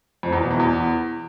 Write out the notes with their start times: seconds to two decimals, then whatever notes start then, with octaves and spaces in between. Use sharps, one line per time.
0.23 F2
0.32 E2
0.41 B2
0.50 E3
0.59 E2